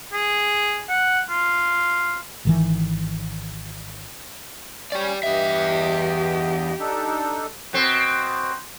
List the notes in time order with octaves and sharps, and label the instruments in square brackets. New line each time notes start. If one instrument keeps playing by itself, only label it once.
[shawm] G#4
F#5
F4
[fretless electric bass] G#1 D#3 E3
[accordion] G3 C#4 C#5 [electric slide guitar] G4 D5
[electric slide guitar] E2 E5 [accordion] G2 B3 D#5 [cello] G4
[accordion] D4 D#4 A4
[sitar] B2 C4